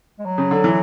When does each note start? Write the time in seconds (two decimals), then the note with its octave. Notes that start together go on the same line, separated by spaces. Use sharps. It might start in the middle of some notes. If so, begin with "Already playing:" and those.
0.19 G#3
0.25 F#3
0.38 C#3
0.51 D3
0.64 E3